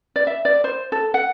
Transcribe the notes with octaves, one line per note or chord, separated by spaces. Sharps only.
D5
E5
D5
C5
A4
F#5